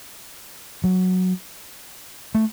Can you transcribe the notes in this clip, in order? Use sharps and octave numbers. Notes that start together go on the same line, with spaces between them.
F#3
A3